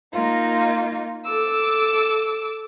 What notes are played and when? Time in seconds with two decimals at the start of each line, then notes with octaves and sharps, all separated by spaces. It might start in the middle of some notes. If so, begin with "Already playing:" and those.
0.13 A#3 D#4 F4
1.25 A4 D6 E6